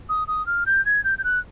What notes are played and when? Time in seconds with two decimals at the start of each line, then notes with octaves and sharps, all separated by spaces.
0.09 D#6
0.28 D#6
0.47 F6
0.66 G6
0.86 G#6
1.04 G6
1.18 G6
1.24 F#6